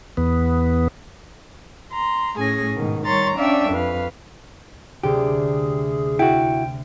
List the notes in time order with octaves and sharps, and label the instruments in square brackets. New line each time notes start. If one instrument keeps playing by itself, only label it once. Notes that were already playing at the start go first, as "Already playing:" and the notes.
[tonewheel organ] E2 B3
[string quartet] A#5 C6
A2 C#4 G#4 G#5 A#6
G#2 B2 D#3
D#3 G3 C#5 A#5 C6 A6
C#4 D4 D5 E5 F5 G5
F2 B4 F5
[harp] D2 C3 [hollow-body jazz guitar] G4 [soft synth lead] G#4
[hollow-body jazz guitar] E4 F#4 [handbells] G5